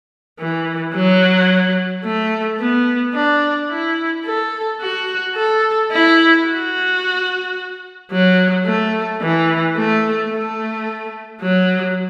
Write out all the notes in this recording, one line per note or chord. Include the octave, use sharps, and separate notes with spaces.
E3
F#3
A3
B3
D4
E4
A4
F#4
A4
E4
F#4
F#3
A3
E3
A3
A3
F#3